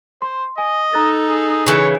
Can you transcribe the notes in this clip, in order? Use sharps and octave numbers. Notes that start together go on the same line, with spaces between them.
C5 C6
D#5 G#5
D#4 A4 A#5 F#6 A6
G#4
C#3 E3 C#5